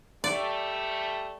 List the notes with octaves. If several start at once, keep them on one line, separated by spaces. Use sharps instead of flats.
G3 A3 D5